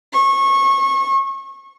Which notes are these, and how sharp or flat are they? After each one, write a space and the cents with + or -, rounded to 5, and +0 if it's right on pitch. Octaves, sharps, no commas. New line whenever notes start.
C#6 -25